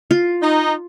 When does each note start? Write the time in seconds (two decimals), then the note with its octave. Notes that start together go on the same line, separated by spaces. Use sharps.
0.11 F4
0.43 D#4